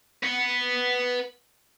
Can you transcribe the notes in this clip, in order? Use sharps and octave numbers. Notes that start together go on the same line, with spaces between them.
B4 F#5